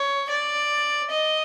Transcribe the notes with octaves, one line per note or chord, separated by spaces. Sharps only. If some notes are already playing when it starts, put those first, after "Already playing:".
Already playing: C#5
D5
D#5